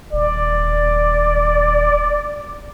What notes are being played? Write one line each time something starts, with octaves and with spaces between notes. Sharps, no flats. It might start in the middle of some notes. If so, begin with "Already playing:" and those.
D#1 D5